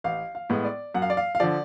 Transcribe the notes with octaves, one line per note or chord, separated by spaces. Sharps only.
A1 F5
F5
A2 G#3 B3
D5
F#2 F#5
F5
D5
F5
F5
D3 F3 D5